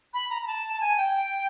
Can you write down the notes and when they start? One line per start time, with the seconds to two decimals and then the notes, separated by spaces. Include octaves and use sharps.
0.14 B5
0.30 A#5
0.42 A#5
0.47 A5
0.73 A5
0.81 G#5
0.97 G5